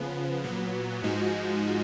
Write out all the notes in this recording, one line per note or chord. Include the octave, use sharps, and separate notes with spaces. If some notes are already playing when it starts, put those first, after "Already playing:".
Already playing: C#3 F3 B3
A#2 F#3 B3
G#2 F3 G#3 D#4 F#4